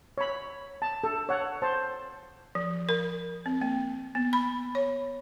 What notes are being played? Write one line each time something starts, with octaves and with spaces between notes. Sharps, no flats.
C#5 B5
A5
A4
C#5 F#5
C5 A5
F3
A#4
C4
A#3
B3
B5
C#5